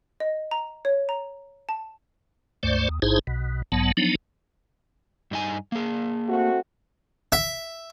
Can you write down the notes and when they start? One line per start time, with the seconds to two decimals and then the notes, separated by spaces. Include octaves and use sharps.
0.20 D#5
0.51 A#5
0.85 C#5
1.09 A#5
1.69 A5
2.63 C#2 G2 A3 C5 D5
2.89 D#2
3.02 A1 G#2 D#4 E4 G#4 C5
3.27 B1 B2
3.72 B1 G#2 F#3 B3 A5
3.97 F3 F#3 B3 D4 D#4
5.31 G2 D#4 G#5
5.72 A#3 G#4
6.28 A3 C4 F#4
7.32 E5